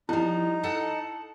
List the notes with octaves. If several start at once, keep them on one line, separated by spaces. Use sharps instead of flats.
F3 G3 D#4 E4
A4 F#5 A5